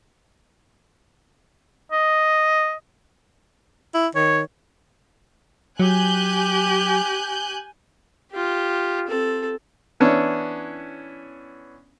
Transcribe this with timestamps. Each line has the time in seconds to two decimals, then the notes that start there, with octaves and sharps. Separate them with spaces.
1.92 D#5
3.94 E4
4.15 D#3 C#5
5.79 F#3 G4 G#5 F#6 G6
8.32 F4 G4
9.07 C4 A4
10.00 E3 B3 C#4 D4 E4